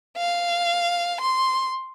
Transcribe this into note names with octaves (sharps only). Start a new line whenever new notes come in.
F5
C6